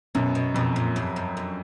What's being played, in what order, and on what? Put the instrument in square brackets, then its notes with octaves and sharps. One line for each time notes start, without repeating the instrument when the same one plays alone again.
[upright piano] F#2 [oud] B2
[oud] B2
[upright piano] F2 [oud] B2
[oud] A#2
G2
G2
F#2